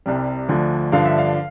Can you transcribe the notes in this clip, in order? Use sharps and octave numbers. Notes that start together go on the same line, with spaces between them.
C2 C3 G3
D2 D3 F3
G2 D3 F3 F5
E5
F5